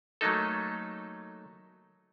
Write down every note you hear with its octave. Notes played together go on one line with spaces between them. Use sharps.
F#3 A3 A#3 D#4 A4